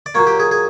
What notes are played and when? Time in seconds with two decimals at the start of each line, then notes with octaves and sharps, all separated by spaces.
0.06 D5
0.15 A#2 F#3 A#3 C#5
0.27 G4
0.40 G#4
0.51 G#4